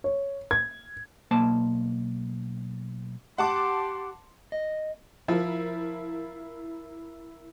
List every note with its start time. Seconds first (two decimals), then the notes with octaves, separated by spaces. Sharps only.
0.04 C#5
0.51 G#6
1.31 B1 A#3 C5 A5
3.38 G4 F#5 A5 C6 D6
4.52 D#5
5.28 F3 E4 A#4